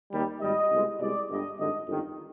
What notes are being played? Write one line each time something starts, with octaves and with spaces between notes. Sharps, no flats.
D#2 D#3 G3
G#1 G#2 G3 D#5
C2 B2 G#3
C2 B2 G#3 D5
G1 G2 D3 G3 D#5
G#1 G2 D3 D#5
G1 F2 D#3